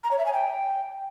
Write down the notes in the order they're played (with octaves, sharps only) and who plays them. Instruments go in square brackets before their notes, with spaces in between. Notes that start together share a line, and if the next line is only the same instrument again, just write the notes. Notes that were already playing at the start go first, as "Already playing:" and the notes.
[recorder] A#5
C#5
E5
G#5
G5